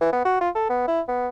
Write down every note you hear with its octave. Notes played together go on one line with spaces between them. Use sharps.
E3
B3
F#4
F4
A4
B3
E4
B3